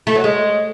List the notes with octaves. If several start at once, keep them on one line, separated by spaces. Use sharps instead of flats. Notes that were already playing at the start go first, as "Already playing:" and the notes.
A3
F#3
G#3